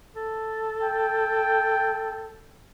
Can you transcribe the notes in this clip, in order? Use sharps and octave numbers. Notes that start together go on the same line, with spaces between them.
A4
G5